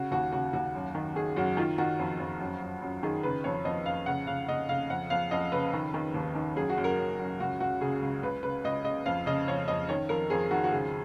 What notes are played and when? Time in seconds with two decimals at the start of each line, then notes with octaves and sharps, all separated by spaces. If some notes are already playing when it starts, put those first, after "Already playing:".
Already playing: C#3 F#4
0.11 D#2 F#4
0.32 C#3 F#4
0.53 D#2 F#4
0.75 F#2
0.95 D#3
1.16 D#3 G#4
1.37 F#2 F#4
1.57 D#3 F4
1.78 D#3 F#4
1.99 F2
2.20 F2
2.40 F#2
2.62 F#2
2.82 F#2
3.03 D#3 G#4
3.23 C#3 B4
3.44 F2 C#5
3.65 F2 D#5
3.86 F2 F5
4.06 C#3 F#5
4.27 C#3 F5
4.48 C#3 D#5
4.69 C#3 F5
4.90 F2 F#5
5.10 F2 F5
5.31 F2 D#5
5.52 C#3 B4
5.73 D#3
5.94 D#3
6.14 D#2
6.35 D#3
6.56 F#2 G#4
6.70 F#4
6.78 F#2
6.84 A#4
6.98 F#2
7.19 F#2
7.40 C#2 F#4
7.60 C#2 F#4
7.81 C#3 G#4
8.02 C#2
8.23 C#2 B4
8.43 C#3 B4
8.64 C#2 D#5
8.84 C#3 D#5
9.06 F2 F5
9.26 C#3 D#5
9.48 F2 C#5
9.68 F2 D#5
9.89 D#3 C#5
10.09 F2 A#4
10.30 F2 G#4
10.51 D#3 F#4
10.64 F#4
10.72 C#2 G#4